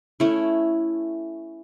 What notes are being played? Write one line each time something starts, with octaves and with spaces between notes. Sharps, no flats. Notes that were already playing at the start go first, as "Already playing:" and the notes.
A3 C#4 E4